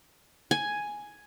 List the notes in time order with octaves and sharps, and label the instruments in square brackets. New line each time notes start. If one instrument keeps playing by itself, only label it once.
[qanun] G#5